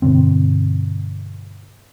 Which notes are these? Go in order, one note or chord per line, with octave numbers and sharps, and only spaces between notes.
G2 B2 D3 C4